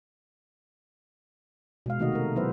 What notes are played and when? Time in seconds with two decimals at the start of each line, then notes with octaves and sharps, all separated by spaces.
1.86 B2 G#3 F5
1.99 C3 D#3 A3 F#4 D#5
2.12 A3 A#4
2.36 F#3 B3 E4 B4 C5 E5